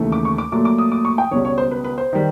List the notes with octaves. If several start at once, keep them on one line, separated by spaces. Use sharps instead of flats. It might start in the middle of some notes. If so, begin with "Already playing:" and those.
Already playing: D#2 C#3 E3 A3
D6
C#6
D6
A#2 F#3 A3 D6
D6
D#6
D6
C#6
G5
C#2 B2 G3 C#5
C#5
C5
B4
B4
C5
D#3 G3